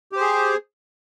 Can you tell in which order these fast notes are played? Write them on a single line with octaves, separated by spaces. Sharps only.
G4 C5 G#4